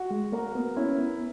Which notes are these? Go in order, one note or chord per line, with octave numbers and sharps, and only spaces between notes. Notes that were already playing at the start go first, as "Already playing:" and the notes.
Already playing: F#4
G#3
A#3 A#4
B3
C#4 E4
B3